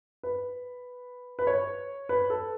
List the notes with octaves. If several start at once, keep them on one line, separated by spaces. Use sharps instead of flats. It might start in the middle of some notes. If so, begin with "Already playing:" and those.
B4
B4
C#5
B4
A4